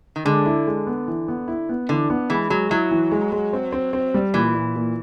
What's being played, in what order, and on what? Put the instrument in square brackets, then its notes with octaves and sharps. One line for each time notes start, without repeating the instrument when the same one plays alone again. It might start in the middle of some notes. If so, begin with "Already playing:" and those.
[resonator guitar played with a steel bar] D#3
[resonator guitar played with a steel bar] D3 [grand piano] G#3
[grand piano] E4
G#3
B3
E3
B3
E4
B3
[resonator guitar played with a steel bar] D3 [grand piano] E3
[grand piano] B3
[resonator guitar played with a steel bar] E3 [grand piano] G#3
[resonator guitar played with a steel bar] F#3 [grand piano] G#3
[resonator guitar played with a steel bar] F#3 [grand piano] E4
[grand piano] E3
G#3
G#3
C4
C4
C4
G3
[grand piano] A#2 [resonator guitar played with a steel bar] E3
[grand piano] A#2
A#2